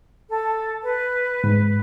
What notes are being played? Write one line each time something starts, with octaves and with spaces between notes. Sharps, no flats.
A4
B4
G#2